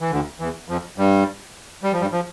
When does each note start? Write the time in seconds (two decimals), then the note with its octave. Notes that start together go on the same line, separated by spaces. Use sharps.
0.01 E3
0.11 D2 D3
0.40 E2 E3
0.68 F2 F3
0.98 G2 G3
1.83 G3
1.93 F3
2.01 G2 G3
2.12 F3